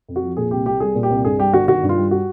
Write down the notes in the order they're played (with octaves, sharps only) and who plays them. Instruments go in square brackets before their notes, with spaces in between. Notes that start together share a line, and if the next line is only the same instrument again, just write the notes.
[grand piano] F2
F#4
F3
A#2 G#4
C2 G4
C2 G4
G3 G#4
A#2
G4
C2
G2 G#4
G3 G4
G1 F#4
D#3 F#4
G2
F4
G3
F#4